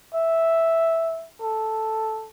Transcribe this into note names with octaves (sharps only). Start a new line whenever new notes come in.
E5
A4